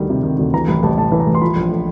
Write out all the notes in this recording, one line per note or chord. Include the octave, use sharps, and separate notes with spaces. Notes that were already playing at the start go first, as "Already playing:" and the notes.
Already playing: D2 D#3 G3
C3
D#3
D2
E3 A#5
A1 B5
A1 A5
A2 A5
E3
A#5
A1
C6
F3 B5
A#1
A3